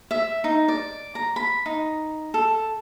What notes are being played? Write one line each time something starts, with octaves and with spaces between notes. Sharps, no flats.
E5
D#4
D5
A#5
B5
D#4
A4